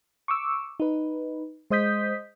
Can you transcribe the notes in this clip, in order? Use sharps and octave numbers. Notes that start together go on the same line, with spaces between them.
C#6 D6 E6
D#4 B4
G#3 C5 D#5 D#6 G6 B6